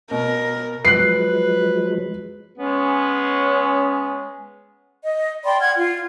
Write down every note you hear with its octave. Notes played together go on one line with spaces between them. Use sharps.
B2 A#4
F3 F#3 G#3 B4 F#6 C7
G#3 B3 C#4
D#5
D5 G5 B5 C6
F#5 F6 G#6
F4